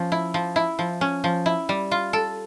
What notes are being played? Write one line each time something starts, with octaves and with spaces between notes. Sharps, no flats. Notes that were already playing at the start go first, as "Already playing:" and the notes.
Already playing: F3 C#4
E4
F3
E4
F3
C#4
F3
E4
G3
F4
A4